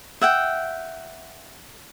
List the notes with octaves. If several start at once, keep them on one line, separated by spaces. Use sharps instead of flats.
E5 F#5 G5